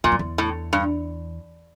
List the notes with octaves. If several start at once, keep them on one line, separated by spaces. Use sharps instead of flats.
E2 A#2
F2
E2
A2
G2